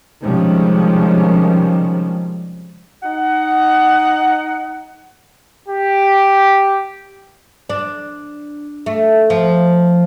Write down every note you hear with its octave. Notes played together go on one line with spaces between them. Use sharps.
C3 D#3 F3 G3 G#3 C#4
D#4 F#5
G4
D4
A3
F3